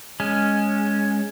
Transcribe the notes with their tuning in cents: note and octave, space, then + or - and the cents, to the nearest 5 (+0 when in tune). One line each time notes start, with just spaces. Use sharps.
G#3 -5 C#4 +0